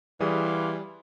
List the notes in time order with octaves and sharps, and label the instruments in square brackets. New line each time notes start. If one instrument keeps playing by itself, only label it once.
[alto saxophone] E3 [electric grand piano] G3 G#4 D#6 [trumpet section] F5 C6 D6